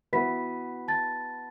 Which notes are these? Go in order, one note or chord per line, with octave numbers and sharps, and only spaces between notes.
E3 B3 F#4 B4 E5 B5 B6
A5 A6